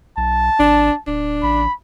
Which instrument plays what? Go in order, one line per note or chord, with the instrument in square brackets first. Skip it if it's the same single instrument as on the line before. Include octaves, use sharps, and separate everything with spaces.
[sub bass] B1 [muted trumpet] A5
[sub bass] G#1 [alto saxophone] D4
[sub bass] D1 [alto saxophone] D4
[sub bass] A1 [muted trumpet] B5